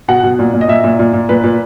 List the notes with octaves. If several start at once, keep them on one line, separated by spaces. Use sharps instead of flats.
B2 F#5
B2
A#2
A#2
D#5
A#2 E5
A#2
A#2
A#2
A#2 B4
A#2